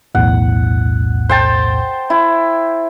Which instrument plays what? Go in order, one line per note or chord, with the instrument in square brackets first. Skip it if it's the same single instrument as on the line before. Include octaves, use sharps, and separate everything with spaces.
[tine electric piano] B1 E2 A2 [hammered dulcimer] F#5
[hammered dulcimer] C5 G5 A5
E4